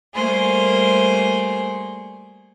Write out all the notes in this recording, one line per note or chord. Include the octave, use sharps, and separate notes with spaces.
G3 A3 A#3 G#4 C5